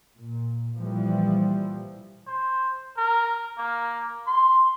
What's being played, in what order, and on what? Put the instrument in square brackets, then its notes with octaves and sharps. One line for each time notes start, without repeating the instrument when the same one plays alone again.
[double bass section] A#2
A#2 E3 F3 G3
[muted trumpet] C5
A#4
A#3
C6